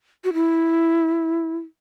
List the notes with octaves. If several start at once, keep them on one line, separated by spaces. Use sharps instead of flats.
F#4
E4